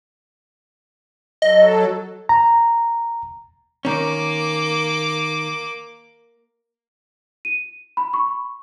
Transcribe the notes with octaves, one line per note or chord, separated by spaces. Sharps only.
F#3 A4 D#5
A#5
D#3 A#3 C#4 D6
D#7
B5
C#6